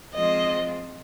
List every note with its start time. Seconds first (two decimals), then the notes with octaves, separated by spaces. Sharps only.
0.14 F3 G#3 C4 F4 D#5